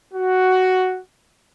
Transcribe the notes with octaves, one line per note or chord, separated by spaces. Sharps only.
F#4